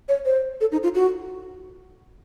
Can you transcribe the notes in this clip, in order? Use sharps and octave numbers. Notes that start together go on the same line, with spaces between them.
C#5
C5
A4
D#4
F4
F#4